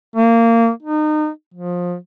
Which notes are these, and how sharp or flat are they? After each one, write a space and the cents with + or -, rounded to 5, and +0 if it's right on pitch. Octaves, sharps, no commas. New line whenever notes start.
A#3 -20
D#4 -30
F3 +20